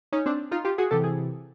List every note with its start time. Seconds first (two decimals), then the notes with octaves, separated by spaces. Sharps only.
0.12 C#4 D#4
0.26 C4 D4
0.51 D#4 F4
0.65 F4 G4
0.78 F#4 G#4
0.91 C3 E3 G4 A4
1.04 G#4